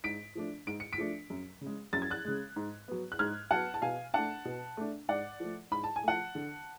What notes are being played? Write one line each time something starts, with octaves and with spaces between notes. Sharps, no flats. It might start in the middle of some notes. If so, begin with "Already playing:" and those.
G#2 B6 D7
F3 A3 D4
G#2 D7
C#7
B6 D7
F3 A3 D4
F#2
C#3
G#3
F#2 A6
G#6
F#6 A6
C#3 G#3
G#2
F#3 B3
F#6
G#2 F6 G#6
F#3 B3 F#5 A5
A5
B2 F5 G#5
A3 D4 F#5 A5
B2
A3 D4
G#2 D5 F#5
F3 A3
G#2 B5
A5
G#5
F3 A3 F#5 A5
D3